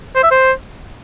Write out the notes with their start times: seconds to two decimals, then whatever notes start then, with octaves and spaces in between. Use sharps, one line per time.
0.15 C5
0.23 E5
0.31 C5